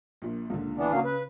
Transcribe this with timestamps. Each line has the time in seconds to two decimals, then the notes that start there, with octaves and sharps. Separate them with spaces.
0.22 A#1 A#2
0.50 C#2 A#2 D3
0.78 E3 B3 D4
0.92 C#3 F#3 A#3 F5
1.05 B4